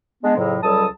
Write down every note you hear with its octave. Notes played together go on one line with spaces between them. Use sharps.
G#3 B3 D4
F2 A2 C#3 F#3
C#2 F#3 G3 A4 A5 D#6